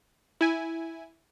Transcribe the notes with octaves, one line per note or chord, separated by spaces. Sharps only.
E4 G#5